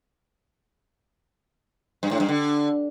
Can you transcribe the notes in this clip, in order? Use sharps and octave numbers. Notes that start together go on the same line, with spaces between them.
G2
A2
G2
D3